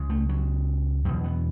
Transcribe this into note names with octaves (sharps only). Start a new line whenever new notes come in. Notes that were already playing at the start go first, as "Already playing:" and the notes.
Already playing: C#2 C#3
A3
F#3
E2 B2 F#3
B3